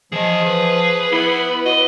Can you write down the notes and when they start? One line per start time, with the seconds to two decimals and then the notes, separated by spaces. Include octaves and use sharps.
0.12 E3 F3 G#4 D#5
0.46 B4
1.12 B3 E4
1.65 F#4 D#5